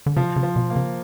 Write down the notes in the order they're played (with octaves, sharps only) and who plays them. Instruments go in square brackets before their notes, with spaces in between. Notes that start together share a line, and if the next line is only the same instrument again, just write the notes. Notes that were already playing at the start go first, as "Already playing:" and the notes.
[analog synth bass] D3
[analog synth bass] C#3 [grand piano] F3
[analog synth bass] C#3
[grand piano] F3
[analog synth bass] B2
[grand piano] A#3
[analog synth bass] C#3